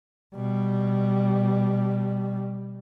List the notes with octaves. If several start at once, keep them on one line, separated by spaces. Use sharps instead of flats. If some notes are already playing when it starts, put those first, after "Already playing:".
B2 G3